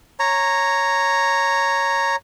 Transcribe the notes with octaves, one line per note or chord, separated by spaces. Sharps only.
C#5 A#5